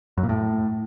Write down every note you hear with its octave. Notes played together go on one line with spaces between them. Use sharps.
F#2
A#2
A2